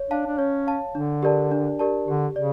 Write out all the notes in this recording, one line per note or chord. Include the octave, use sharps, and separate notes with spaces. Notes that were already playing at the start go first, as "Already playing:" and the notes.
Already playing: C#5
D4 F5 A5
D4
C#4 C#5
F5 A5
D3 D4
G4 A#4 D5 A5
D4
G4 A#4 D5 A5
D3 G4
C#3 D5